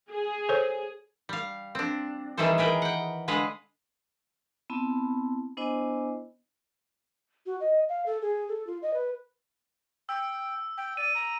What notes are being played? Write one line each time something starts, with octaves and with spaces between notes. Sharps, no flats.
G#4
A4 C5 C#5
G3 F5
C4 D4
D#3 E3 G3 G#4 A4 C5
G#4 A#4 B4 G5
F#5 G5
D3 G#3 G#4 B4 D#5 F5
B3 C4 E4 A5 B5
B3 D4 E4 C5 D#5 G#5
F#4
D#5
F5
A4
G#4
A4
F4
D#5
B4
G5 E6
G5
D5 D#7
A#5